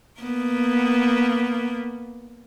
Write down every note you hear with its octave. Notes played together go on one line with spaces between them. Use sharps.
A#3 B3